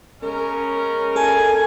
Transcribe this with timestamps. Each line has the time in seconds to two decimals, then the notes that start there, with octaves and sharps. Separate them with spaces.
0.23 C#3 G#3 C#4 A#4
1.16 A4 G#5